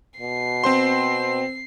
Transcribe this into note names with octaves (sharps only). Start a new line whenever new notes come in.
B2 C7
C4 C5 C6